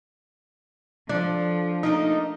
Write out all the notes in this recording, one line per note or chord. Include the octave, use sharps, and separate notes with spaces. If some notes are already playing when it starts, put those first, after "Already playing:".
F3 D4 A4
A3 A#3 D#4 D#5